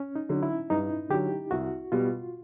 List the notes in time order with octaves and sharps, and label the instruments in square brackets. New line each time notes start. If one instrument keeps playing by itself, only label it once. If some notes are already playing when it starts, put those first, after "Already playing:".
Already playing: [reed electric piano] C#4
D#4
[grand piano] D3 F#3
[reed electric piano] E4
[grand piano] G2 [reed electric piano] D#4
[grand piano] D3 F#3 [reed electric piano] G4
[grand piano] C2 [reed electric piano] F#4
[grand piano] B2 G3 [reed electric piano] F4